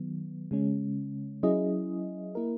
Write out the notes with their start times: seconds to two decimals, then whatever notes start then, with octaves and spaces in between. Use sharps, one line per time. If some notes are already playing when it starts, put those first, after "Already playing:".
Already playing: D#3 F#3 B3
0.51 C#3 G#3 C#4
1.43 F#3 C#4 E4 G#4 D#5
2.35 A#3 E4 A#4